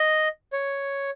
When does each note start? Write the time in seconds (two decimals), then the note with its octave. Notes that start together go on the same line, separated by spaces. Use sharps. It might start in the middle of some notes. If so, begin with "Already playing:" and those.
Already playing: D#5
0.53 C#5